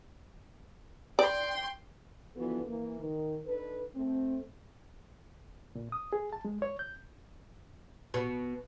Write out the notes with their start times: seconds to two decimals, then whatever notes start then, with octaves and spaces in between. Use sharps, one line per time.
1.19 D5 G5 C6
2.36 D3 E3 F3 B3 F#4 A4
2.67 E3 A#3
3.01 D#3
3.47 D4 D#4 A4 B4
3.95 A3 C4
5.75 A#2
5.92 D#6
6.13 G#4
6.33 A5
6.45 G#3
6.62 C#5
6.79 G6
8.14 B2